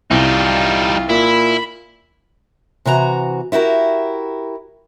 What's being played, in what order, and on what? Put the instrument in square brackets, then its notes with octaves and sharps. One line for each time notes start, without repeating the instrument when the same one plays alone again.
[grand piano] C2 [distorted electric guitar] G3 D#4 [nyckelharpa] F4
[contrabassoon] A#2 [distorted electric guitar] E4 E5 [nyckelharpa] B5
[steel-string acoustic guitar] C3 E3 F#4 A#5
E4 F#4 G4 A#4